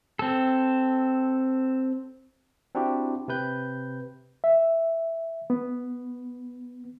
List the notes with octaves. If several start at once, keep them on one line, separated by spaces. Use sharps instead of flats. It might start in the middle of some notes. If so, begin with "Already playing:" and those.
C4 A4
C4 D4 E4 F#4 G4
C3 C4 B4 G6
E5
B3